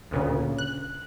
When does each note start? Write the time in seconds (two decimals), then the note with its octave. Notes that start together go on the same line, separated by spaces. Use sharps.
0.11 D2 A#2 C#3
0.58 F#6